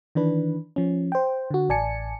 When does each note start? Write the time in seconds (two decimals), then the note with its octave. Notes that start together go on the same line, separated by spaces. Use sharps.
0.15 D#3 E3 D4 B4
0.76 F3 C#4
1.12 C5 G5
1.50 D3 F#4
1.69 A1 D5 G#5 A5 C#7